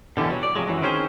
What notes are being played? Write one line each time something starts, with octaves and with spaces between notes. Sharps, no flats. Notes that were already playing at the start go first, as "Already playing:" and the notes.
B2 D3 E3 G3 C#4
F#3
D5
C3 D#3 F3 F#3 G#3
F#2 E3 F#3
D#3 C4 C#4 G#4 A#4 C5